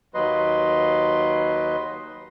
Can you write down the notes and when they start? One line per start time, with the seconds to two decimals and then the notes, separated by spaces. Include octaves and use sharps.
0.14 D#2 F#3 B4 D#5 C6